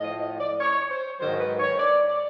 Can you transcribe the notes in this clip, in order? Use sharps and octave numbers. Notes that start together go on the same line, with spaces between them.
A2 F3 D#5
D#5
D5
C#5
C5
G#2 D#3 F#3 C5
B4
C#5
D5
D5